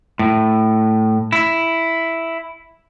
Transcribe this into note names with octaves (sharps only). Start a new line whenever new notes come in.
A2
E4